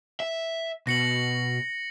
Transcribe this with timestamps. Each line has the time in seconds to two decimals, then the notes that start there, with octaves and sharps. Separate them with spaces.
0.20 E5
0.87 B2 A#6 C#7 F#7